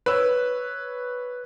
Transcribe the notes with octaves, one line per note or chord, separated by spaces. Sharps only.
B4 C#5 E6